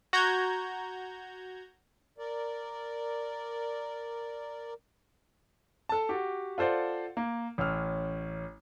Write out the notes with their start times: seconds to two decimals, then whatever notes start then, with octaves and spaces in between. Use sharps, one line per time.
0.13 F#4 A#5 G6 G#6
2.18 A#4 D5
5.89 A4 A5
6.09 F#4 G4
6.58 F4 A4 C5 D5 F#5
7.17 A#3
7.58 A1 C#4 E6 F6